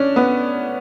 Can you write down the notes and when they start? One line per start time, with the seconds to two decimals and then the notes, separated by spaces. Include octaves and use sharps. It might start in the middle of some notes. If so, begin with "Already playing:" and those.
Already playing: C#4 D4
0.16 B3